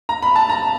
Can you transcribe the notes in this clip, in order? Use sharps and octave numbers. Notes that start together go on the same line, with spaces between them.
A#5
B5
A5
A#5